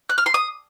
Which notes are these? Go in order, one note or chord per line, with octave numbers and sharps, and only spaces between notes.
F#6
F6
C6
D#6